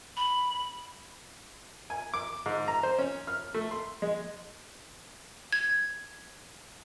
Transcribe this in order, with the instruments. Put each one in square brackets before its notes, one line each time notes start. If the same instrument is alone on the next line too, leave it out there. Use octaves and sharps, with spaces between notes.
[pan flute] B5
[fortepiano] G#5
D6
G#2
A#5
C5
C#4
F6
A3
C6
G#3
[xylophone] G#6